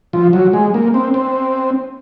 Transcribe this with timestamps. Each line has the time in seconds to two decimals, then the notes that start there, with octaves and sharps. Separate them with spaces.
0.13 F3
0.33 F#3
0.53 G#3
0.74 A#3
0.94 C4
1.14 C4